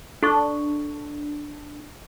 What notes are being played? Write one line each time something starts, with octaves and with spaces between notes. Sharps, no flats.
D4 A4 C#6